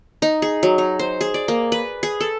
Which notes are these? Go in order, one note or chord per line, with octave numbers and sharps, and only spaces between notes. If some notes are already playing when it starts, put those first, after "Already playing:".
D#4
G#4
F#3
D#4
C5
G#4
D5
A#3
B4
G#4
A4